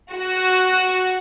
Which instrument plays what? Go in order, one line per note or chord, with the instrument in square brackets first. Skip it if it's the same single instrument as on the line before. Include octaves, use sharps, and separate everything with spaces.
[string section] F#4